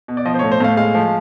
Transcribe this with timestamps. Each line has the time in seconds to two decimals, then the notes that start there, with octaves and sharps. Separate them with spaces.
0.08 B2
0.17 D5
0.25 F3 D#5
0.34 C5
0.39 A2 C#5
0.52 C5
0.60 A2 F5
0.77 G#3 F5
0.95 F3